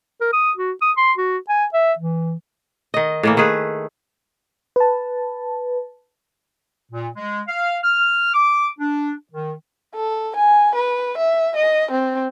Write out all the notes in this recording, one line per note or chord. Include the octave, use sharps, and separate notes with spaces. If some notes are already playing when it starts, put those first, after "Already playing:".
A#4
D#6
F#4
D#6
C6
F#4
G#5
E5
E3
D#3 D#5
A2 E3 A#3
D#3 A3 G#4 B4
B4 A5
A#2
G#3
F5
F6
D6
D4
D#3
A4
G#5
B4
E5
D#5
C4